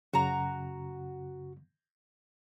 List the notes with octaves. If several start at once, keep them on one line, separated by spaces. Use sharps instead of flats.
F#2 C#3 F#4 A#5